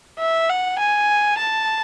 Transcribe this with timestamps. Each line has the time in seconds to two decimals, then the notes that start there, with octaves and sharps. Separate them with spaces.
0.19 E5
0.49 F#5
0.79 G#5
1.38 A5